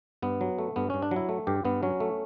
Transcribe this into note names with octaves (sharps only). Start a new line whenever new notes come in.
G2 B3
F#3
A3
G2 B3
G2 C#4
D4
F#3 E4
A3
G2 G4
G2 B3
F#3 C#4
A3